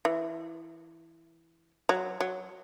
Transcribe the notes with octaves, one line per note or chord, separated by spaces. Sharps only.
E3
F#3
F#3